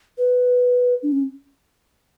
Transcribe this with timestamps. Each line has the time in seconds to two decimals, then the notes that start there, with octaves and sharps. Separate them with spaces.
0.18 B4
1.03 D4
1.12 C#4